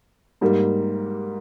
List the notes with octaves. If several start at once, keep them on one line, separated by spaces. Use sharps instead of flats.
G#2 G3 A#3